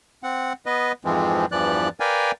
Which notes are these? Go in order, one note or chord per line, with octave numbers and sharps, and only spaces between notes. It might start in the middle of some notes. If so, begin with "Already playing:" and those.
C4 F#5
B3 B4 D#5
F2 G#2 E3 F3 G#3 C4
E2 G2 E3 F3 D5 F#6
A#4 B4 D5 F5 G5 G#5